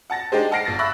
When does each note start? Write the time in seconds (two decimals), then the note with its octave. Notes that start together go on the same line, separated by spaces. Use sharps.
0.10 F#5 A5 A6 A#6
0.32 G#3 D4 D#4 G4 G#4 C5
0.51 F#5 A5 F6 A#6 C7 D7
0.65 G1 A6 A#6
0.79 E5 B5 C#6 E6 F#6 A#6